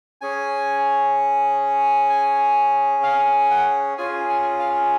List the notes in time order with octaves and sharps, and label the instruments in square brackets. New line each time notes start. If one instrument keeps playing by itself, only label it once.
[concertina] C#4 G#4 G#5
G#5
F5
F#5
C#4 F4 G#4 G#5
G#5
F5